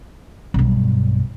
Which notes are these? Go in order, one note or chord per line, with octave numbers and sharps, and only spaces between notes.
B1 G2